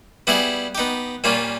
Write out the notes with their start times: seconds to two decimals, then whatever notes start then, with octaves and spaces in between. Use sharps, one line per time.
0.27 G3 B3 E4 G#4
0.75 B3 D#4 G4
1.24 A#2 G3 A#3 C#4 F4